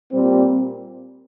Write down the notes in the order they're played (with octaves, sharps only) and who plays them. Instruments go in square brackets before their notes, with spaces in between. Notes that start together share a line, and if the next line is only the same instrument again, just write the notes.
[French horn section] A#2 G3 C4